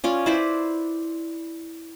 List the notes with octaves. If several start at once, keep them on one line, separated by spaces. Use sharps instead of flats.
C#4 F4 D5
E4 B4 C5 D5